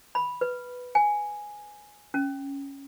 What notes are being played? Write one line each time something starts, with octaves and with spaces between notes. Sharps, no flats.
B5
B4
G#5
C#4